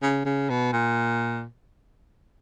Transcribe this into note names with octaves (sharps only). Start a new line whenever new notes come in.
C#3
C#3
B2
A#2